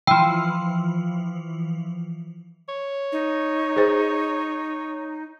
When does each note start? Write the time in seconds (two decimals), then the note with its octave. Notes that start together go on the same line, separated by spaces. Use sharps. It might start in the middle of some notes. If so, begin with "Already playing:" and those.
0.07 E3 F3 G5
2.69 C#5
3.12 D#4
3.76 G#4 C5